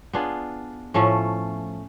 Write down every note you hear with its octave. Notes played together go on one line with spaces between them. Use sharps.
B3 D4 F4 G#4
A2 F3 A3 C#4